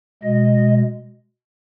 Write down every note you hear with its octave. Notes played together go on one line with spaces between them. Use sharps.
B2 G#3 D#5